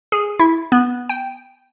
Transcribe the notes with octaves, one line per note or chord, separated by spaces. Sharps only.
G#4
E4
B3
G5